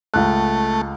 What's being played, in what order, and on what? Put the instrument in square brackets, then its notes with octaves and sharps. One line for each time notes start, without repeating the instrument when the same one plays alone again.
[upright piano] C#2 F#6 [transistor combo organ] A3